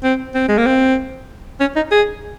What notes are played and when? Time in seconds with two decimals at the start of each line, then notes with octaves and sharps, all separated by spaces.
0.03 C4
0.35 C4
0.48 G#3
0.58 A#3
0.66 C4
1.60 C#4
1.76 D#4
1.91 G#4